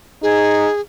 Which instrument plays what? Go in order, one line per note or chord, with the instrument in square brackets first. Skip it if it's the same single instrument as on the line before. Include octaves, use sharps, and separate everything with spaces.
[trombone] D#4 [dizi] G#4